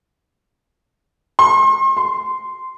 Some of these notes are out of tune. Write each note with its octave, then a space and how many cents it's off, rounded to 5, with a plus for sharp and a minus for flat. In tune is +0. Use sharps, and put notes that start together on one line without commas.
C6 +40
C6 -15